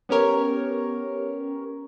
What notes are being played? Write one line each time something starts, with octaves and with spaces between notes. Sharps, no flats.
B3 C#4 G4 A#4 C#5